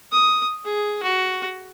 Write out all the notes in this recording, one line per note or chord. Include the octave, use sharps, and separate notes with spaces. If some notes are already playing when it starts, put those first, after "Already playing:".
D#6
G#4
F#4